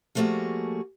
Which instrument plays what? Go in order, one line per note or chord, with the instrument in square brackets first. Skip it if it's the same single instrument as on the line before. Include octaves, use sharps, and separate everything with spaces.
[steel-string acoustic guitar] F3 G3 A3 A#3 F#4 G#4